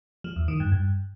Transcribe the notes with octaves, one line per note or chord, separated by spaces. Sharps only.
F3
E2
D#3
G2
G2